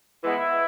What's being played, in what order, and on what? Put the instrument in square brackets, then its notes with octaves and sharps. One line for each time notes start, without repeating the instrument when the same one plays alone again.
[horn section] E3 G#3 B3 E4